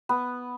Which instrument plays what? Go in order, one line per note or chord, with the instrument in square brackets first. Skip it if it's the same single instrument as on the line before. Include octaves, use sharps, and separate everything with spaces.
[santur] B3